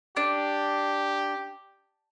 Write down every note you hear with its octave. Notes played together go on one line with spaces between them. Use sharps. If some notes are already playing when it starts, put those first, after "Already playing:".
D4 G4